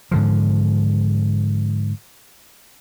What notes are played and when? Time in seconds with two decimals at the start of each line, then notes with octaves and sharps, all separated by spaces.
0.11 G#2 D3 F3